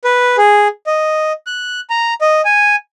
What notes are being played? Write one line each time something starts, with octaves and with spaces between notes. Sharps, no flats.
B4
G#4
D#5
F#6
A#5
D#5
G#5